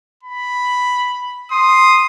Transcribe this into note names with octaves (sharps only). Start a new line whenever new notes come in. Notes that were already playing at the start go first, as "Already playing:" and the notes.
B5
C6 D#6